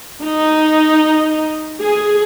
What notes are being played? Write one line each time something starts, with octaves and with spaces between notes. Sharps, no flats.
D#4
G#4